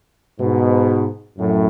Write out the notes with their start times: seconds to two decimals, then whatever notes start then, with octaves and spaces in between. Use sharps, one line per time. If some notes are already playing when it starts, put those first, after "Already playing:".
0.38 G#2 B2
1.37 F#2 A2